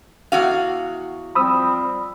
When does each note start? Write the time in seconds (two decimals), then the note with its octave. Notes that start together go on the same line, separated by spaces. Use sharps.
0.32 E2 F#4 F5
1.35 F3 G3 C4 B5 D#6 E6